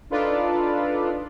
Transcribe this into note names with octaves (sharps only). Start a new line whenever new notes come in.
D4 D#4 F4 A4 B4 D5